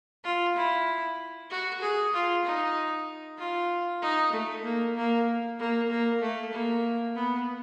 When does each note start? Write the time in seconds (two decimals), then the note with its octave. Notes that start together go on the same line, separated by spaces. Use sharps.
0.24 F4
0.56 E4
1.50 F#4
1.81 G#4
2.13 F4
2.45 D#4
3.38 F4
4.02 D#4
4.32 A3
4.64 A#3
4.95 A#3
5.59 A#3
5.89 A#3
6.21 A3
6.52 A#3
7.15 B3